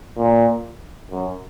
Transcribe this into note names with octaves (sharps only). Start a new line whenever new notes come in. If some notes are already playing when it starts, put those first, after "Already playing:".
A#2
F#2